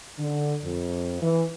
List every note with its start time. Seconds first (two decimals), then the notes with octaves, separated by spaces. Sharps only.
0.18 D3
0.63 F2
1.22 E3